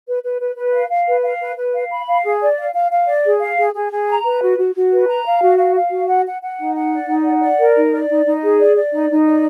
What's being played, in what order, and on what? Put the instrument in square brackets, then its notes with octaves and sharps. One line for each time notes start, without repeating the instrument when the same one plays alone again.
[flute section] B4
B4
B4
B4
F5
F5
B4
F5
B4
B4
F5
B5
F5
G#4
D5
F5
F5
F5
D5
G#4
F5
G#4
G#4
G#4
A#5
B4
F#4
F#4
F#4
B4
A#5
F5
F#4
F5
F5
F#4
F#5
F#5
F#5
D#4
F#5
D5
D#4
F#5
D5
A#4
D#4
D5
D#4
D#4
G#4
D5
D5
D#4
D#4
D5